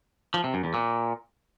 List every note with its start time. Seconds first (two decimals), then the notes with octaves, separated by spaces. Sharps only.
0.34 F3
0.44 C3
0.54 F#2
0.64 E2
0.74 A#2